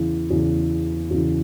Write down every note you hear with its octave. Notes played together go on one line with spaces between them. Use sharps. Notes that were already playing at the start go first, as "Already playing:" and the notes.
Already playing: E2 C#3 E3
E2 C#3 E3
E2 C#3 E3